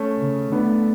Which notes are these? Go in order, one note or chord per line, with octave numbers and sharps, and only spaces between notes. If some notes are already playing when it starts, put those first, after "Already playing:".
Already playing: A3 C#4
C#3
A3 B3 D4